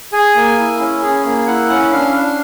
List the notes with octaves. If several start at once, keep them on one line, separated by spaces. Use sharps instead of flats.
G#4 G#5
A#3
E4
C#4
G#4
A#3
E4 F#5
C#4
D4 F5
D4